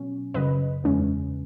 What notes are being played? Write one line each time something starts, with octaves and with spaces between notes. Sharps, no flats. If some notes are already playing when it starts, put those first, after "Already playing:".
Already playing: B2 F#3 C#4
F#2 C#3 F#3 B4 D#5
E2 C#3 G#3 C#4